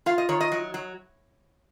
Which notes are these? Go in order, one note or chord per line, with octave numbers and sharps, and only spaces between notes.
F4 F5
D#5
D#3 C#5
D#5
F#3
F#3